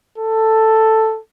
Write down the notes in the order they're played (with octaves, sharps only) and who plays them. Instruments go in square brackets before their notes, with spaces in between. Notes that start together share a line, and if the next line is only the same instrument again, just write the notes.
[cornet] A4